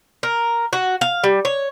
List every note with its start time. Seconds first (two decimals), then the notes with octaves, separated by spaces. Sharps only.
0.23 A#4
0.73 F#4
1.01 F5
1.24 G3
1.45 C#5